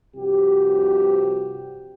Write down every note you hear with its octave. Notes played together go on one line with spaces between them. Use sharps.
C2 G2 C3 F3 F#4 G4